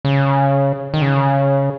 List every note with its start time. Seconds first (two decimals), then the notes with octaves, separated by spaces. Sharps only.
0.05 C#3
0.94 D#3
1.02 C#3